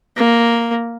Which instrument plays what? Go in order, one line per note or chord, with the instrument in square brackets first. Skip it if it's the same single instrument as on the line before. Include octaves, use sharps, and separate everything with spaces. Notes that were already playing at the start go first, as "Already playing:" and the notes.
[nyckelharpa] A#3